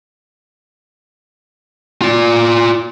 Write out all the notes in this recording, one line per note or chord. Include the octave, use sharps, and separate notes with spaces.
F4 D5